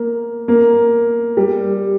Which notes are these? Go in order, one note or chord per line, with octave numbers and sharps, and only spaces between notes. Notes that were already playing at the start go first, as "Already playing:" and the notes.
Already playing: A#3
A#3
G3